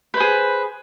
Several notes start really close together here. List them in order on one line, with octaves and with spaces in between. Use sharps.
B4 C5 G#4